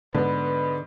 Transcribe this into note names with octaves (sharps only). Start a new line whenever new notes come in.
G#2 D3 B3 B4